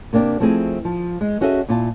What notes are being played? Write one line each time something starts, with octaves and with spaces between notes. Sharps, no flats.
C3 A#3 D4 G4 D5
F3 A3 C4 E4 G#4 D#5
F3
G#3
C#4 F#4 G#4 A4 D#5 E5
A#2 E4 F4 A5